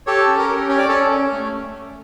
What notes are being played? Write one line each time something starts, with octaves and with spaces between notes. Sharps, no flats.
G4 A4 C#5
C#4
A#4
G4
C#4 C#5
D5
C#4 A4 C#5
C#4
A3